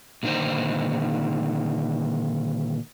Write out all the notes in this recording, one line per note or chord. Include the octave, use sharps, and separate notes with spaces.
A#2 D3 D#3 D#4 C5